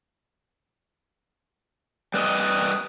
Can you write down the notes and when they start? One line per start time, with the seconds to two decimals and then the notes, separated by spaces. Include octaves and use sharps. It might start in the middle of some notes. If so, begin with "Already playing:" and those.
2.14 G3 B4 D5 D#5